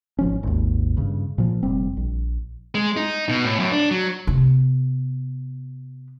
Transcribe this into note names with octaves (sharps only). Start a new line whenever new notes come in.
G#1 F3 C#4
G#1 D#2
G2 C#3
A#2 F3
F1 G3 C4
A#1
G#3
D#4
B2
A2
F#2
D4
F#3
C3 B3